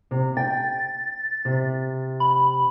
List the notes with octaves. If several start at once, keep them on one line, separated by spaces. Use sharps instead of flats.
C3
G5 A6
C3
B5